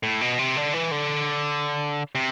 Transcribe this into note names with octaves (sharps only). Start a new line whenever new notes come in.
A2
B2
C3
D3
E3
D3
C3